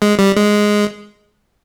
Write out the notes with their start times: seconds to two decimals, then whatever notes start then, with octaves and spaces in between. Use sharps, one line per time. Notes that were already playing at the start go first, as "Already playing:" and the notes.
0.02 G#3
0.19 G3
0.37 G#3